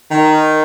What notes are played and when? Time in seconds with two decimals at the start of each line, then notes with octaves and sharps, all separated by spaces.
0.10 D#3